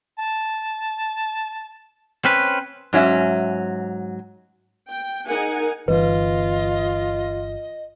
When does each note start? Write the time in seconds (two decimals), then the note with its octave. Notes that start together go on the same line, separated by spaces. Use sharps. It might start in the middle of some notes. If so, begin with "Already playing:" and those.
0.18 A5
2.25 C4 C#4 B4
2.93 G#2 F#3 C#4 E5
4.90 G5
5.28 D#4 G#4 A#4 F#5 G#5
5.88 G1 E3 F4 B4 D#5